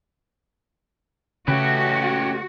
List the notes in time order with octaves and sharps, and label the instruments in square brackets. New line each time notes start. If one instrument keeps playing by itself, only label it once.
[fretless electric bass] C#3 [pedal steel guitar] A3 B4 [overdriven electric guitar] C#4 G4 [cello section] F#4